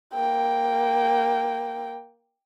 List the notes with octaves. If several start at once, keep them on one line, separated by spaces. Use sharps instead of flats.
A#3 G5